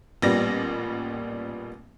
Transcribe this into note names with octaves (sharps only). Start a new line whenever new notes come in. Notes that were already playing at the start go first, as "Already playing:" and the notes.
A1 A#2 G3 B3 A#6